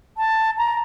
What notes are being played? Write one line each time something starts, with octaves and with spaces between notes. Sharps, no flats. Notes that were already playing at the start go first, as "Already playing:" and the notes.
A5
A#5